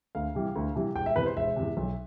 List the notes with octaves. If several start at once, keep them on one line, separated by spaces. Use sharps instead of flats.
D2 F5
C3 E3 G3
D2
C3 E3 G3
E1 G5
E5
E2 C3 B4
C5
E1 E5
E2 C3
B1